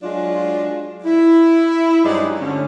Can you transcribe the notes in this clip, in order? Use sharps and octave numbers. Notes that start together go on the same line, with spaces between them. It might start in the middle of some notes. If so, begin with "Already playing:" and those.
F#3 G#3 D4 F4
E4
G2 F#3 G#3 D#4 C5 D5
D3 A3 C#4